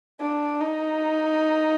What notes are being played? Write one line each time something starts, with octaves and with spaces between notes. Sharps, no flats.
D4
D#4